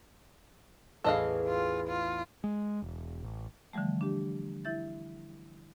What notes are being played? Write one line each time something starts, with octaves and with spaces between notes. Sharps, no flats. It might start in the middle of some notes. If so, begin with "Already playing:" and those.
A1 E2 G#4 A4 D#5 F5
F4
F4
G#3
E1
A1
D3 E3 F3 G3 A3
D4 G4
E4 E5 G6 A6